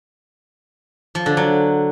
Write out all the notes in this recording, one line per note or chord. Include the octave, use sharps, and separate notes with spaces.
F3
D3
F#3